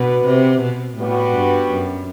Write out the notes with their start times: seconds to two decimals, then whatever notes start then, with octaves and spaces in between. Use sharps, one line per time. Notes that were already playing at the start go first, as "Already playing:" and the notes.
Already playing: B2 B3 D4 F#4 B4
0.26 C3
0.62 B2
0.97 A2 G3 B3 F#4
1.35 G2
1.70 F#2